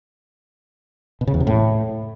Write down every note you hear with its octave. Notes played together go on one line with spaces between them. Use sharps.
B2
C#3
E2
C3
A2